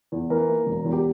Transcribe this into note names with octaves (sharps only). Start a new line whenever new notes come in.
E2
E3 A#4
A#3
E1
E2
G4